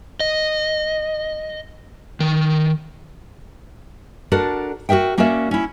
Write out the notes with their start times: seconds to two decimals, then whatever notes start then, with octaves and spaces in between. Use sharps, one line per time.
0.20 D#5
2.20 D#3
4.32 D4 F#4 A4 A#4 D5
4.89 F#4 G#4 A#4 E5 G5
5.18 A#3 C#4 F#4 A#4 D5 E5
5.51 C#4 E4